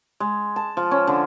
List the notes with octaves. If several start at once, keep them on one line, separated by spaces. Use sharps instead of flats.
G#3
A5
F3
C#4
D3